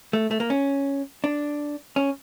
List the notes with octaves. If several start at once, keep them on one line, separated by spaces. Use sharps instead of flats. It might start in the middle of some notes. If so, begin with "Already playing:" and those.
A3
A3
A#3
C#4
D4
C#4